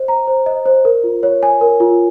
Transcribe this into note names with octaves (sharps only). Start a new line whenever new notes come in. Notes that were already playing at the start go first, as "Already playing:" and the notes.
Already playing: C5 D#5
A#5
C5
D#5
C5
A#4
F4
C#5
G#5
A#4
F4